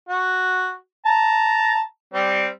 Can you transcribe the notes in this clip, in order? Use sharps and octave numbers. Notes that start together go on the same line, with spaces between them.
F#4
A5 A#5
G3 C4